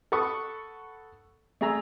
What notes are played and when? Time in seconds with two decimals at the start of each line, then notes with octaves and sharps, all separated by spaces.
0.12 A4 B4 F#5 C#6 D#6
1.61 A3 G#4 A#5 E6